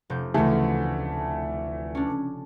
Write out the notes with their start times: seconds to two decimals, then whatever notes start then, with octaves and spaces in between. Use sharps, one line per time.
0.10 F1 G6
0.34 D2 C#3 E3 A3
1.95 C#4 D4